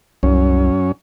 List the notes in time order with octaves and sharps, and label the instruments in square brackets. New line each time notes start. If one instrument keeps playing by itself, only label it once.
[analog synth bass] C2 [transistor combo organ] F#2 C#4